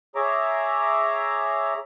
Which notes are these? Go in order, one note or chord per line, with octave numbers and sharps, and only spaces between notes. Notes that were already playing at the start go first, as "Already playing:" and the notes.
G#4 C#5 E5 A#5 D6